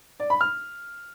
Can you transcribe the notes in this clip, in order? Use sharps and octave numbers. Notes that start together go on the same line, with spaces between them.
D5
B5
F6